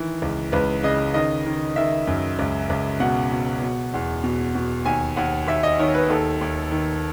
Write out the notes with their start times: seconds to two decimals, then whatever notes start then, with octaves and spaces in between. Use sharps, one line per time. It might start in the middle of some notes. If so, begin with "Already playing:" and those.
Already playing: D#3 E3
0.22 C#2
0.52 C#2 B4
0.83 C#3 D#5
1.14 D#3 D#5
1.46 D#3
1.76 D#3 E5
2.07 F#2
2.39 C#2
2.70 C#2
3.00 B2 F#5
3.32 B2
3.62 B2
3.94 E2
4.24 B2
4.55 B2
4.85 D#2 G#5
5.16 D#2 F#5
5.47 D#2 E5
5.63 D#5
5.79 D#3 C#5
5.94 B4
6.10 D#2 A4
6.41 D#2
6.72 D#3